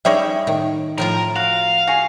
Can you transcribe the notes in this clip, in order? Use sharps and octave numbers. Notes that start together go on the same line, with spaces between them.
G3 C#4 D#4 G#4 C#5 E5
A2 D#3
A2 F3 F4 A#4
F#4 F5
F#4 G#4